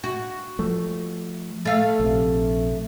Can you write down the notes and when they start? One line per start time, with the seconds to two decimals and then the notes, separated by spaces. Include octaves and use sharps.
0.04 F#4
0.59 F3 A3
1.65 A3 F5
2.00 A#1 C3